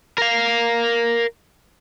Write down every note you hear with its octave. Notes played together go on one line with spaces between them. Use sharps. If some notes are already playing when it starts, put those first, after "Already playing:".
A#4 F5